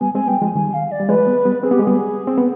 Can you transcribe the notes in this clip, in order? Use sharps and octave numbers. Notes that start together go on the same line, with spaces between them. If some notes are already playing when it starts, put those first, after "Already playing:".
G3 B3 G#5
G#3 C4 G#5
G3 B3 G5
F3 G#3 G#5
D#3 G3 G#5
F5
D5
G3
F3 G#3 B4
G3 B3
G3 B3
C4 G#4
B3 G4
G#3
G3 B3 G#4
C4
B3